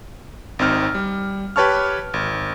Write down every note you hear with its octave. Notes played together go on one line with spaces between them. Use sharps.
G#1 C4 D#4 F6
G3
G4 B4 C#5 A5 C#6 F6
G#1